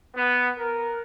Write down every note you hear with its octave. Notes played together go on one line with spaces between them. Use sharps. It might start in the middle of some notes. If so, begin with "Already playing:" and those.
B3
A#4